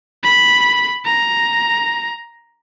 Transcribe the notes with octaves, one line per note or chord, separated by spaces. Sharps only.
B5
A#5